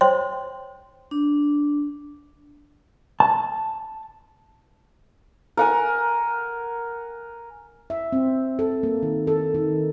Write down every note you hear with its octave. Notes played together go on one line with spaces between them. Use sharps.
C5 C#5 G5 C6
D4
A5
A#4 F#5 G#5
E5
C4
A4
A#3
D#3
A4
D#3